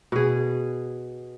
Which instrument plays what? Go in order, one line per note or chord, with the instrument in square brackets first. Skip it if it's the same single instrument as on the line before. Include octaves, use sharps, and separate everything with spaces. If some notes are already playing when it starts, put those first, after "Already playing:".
[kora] B2 G#4